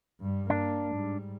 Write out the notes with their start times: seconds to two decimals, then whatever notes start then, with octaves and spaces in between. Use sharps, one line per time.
0.20 G2 G3
0.50 A#3 D4
0.92 G#2 G3